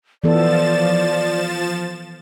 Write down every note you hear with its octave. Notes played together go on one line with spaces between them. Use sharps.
E3 F3 B3 A4 D5 A6 E7